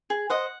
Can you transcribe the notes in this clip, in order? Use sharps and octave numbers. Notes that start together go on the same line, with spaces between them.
G#4
C5 D#5 F#5